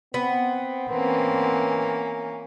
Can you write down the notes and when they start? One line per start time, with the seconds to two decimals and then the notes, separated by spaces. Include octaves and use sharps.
0.14 B3 C4
0.90 E3 A#3 C4 C#4 B4